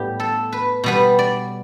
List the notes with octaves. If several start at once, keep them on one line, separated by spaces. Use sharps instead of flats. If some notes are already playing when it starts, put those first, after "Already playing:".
Already playing: A2 G3 B3 G4
A4
B4
B2 G3 B3 B4
D5